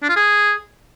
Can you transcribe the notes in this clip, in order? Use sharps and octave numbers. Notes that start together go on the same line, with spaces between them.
D4
F4
G#4